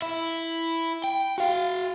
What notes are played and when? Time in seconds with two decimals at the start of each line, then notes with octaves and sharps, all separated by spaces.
0.02 E4
1.04 G5
1.38 F#4 F5